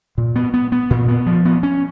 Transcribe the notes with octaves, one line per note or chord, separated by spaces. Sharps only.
A#2
B3
B3
B3
A#2
B3
F3
B3
C#4